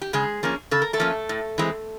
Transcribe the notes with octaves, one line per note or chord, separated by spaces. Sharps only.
G4
C#3 G#3 G#4
F3 A#3 C#4
C#3 A4
A#4
A3 A4
F3 A#3 C#4
A2
E3 G#3 C4